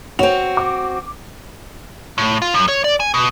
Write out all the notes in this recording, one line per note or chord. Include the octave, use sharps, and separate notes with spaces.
C4 F#4 C#5 F7
D6
A2
F4
F#2
C#5
D5
G#5
B2